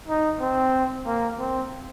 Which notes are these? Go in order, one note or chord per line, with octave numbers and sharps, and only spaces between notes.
D#4
C4
A#3
C4